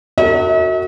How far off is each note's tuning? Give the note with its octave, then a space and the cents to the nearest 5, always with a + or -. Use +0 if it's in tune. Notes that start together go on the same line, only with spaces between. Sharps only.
F#4 +0 A#4 -45 E5 -45